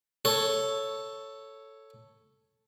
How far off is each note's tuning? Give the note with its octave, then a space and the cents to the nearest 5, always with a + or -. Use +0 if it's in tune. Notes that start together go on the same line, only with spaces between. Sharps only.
A4 +0 C#5 +0